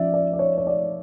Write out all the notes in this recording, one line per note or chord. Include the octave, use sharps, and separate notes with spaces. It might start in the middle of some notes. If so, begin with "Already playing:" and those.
Already playing: F3 C#4 D5 E5
D5
D5
C#5
C#5
D5